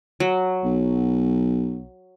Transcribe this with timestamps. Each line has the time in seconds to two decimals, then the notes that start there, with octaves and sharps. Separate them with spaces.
0.20 F#3
0.64 B1